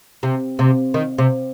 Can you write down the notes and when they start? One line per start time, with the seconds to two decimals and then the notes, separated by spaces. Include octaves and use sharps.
0.23 C3
0.59 C3
0.94 D#3
1.18 C3